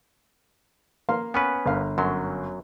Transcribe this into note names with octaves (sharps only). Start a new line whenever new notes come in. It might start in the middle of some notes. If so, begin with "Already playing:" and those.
A#3 F5 C6
B3 C#4 B4 G#5
G1 A#4 F5
F#2 F#3 C6